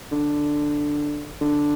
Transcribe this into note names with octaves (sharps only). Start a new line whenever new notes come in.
D3
D3